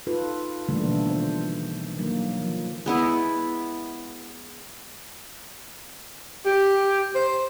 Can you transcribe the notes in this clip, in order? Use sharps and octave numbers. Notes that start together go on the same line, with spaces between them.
D#4 F4 A4 B4
D3 E3 G3 A3 A#3 D4
B2 F3 B3 A4
D#3 C5
D#3 F#3 A#3
F3
G#3 B3 E4
G4
C5